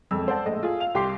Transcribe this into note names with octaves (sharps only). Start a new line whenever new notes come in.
E1 F2 E6
C5 D5 F#5 A5
A#1 A2 G#3 D#5
F4 G#4
F5 F7
C2 G4 G5 C6 D6 C7